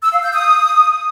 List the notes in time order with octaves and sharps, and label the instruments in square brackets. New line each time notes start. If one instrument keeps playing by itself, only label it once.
[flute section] E6
F5
G6
D#6